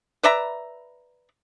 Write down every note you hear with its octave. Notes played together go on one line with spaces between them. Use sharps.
B4 D5 E5 A#5